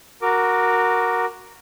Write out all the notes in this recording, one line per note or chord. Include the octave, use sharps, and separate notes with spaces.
F#4 A#4 D6